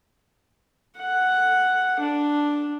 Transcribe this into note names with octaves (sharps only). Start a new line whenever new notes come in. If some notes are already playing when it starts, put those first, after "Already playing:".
F#5
D4